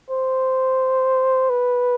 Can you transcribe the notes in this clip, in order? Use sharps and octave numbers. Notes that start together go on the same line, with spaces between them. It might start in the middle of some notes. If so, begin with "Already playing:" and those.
C5
B4